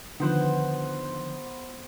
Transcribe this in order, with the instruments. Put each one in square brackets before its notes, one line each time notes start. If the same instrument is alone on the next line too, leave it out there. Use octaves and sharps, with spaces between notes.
[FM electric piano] D3 D#3 F3 [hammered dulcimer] B3 C5 F#5